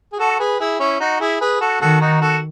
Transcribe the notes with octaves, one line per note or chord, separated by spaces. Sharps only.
G#4
F#4 A4
G#4 B4
E4 G#4
C#4 E4
D#4 F#4
E4 G#4
G#4 B4
F#4 A4
D#3 F#4 A4
D#4 F#4
F#4 A4